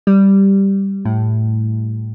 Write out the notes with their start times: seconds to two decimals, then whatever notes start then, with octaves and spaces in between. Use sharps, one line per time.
0.07 G3
1.05 A2